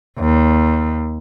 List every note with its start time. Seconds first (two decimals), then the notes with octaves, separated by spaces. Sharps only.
0.19 D#2